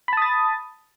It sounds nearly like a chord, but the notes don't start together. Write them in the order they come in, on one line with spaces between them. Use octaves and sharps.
B5 A5 D#6 A6